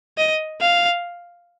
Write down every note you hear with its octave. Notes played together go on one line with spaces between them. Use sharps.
D#5
F5